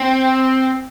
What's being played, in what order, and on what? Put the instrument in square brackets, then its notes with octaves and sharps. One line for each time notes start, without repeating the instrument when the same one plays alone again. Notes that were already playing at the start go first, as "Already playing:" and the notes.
Already playing: [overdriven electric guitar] C4